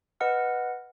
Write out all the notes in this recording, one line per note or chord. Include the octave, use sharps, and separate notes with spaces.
B4 D#5 F#5 F6